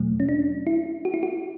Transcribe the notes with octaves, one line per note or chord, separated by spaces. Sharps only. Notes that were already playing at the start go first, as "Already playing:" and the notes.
Already playing: E2 B2 F#3 A3
C#4
D4
E4
F#4
E4
F#4